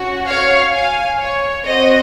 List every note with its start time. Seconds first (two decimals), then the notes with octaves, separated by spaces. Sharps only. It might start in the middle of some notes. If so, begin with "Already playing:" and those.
Already playing: C#4 F#4
0.26 C#5 F5
0.72 F5 G#5
1.19 C#5
1.65 C4 F#4 C5 D#5